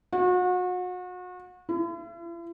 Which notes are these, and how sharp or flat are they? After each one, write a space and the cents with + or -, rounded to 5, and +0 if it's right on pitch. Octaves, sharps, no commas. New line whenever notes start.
F#4 -35
E4 +45